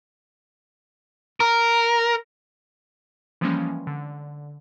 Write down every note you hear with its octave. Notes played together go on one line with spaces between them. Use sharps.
A#4
E3 F3 G3 G#3 A#3 C#4
D3